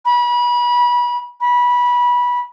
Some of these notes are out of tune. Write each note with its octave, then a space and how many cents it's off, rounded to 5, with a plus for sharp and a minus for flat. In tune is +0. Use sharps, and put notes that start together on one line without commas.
B5 -30
B5 -20